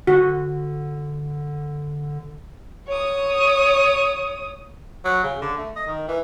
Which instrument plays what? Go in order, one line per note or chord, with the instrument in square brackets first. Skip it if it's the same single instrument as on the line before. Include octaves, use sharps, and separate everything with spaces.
[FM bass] D3 [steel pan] F#4
[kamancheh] C#5 D#6
[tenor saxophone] F#3
C#3
D3
A3
D#5
D#3
E3